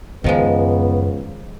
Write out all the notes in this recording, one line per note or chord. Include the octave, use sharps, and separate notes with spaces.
C#2 F#2 D#3 F3 G#3 B3